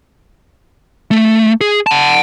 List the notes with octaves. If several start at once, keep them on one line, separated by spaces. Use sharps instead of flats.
A3
G#4
F#5 A5